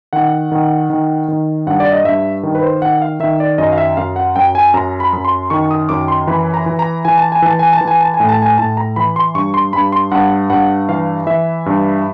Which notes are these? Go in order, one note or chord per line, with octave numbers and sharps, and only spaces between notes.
D#3 F#5
D#3
D#3
D#3
G2 F#5
D5
D#5
G2 E5
D#3
B4
C5
D#3 F#5
F5
D#3 E5
D5
F#2 D#5
F5
E5
F#2 F5
F#5
F#2 G5
G#5
F#2 A#5
B5
F#2
C6
D#3 C#6
D#6
F#2 D6
C6
E3 B5
A#5
E3
A#5
E3 G#5
A5
G#5
E3 A5
G#5
A5
E3
G#5
A5
G#5
A2
A5
G#5
A2 A5
A#5
E3 B5
C6
G2 C#6
C6
G2 B5
C6
G2 F#5
G2 F#5
E3 F5
E3 E5
G2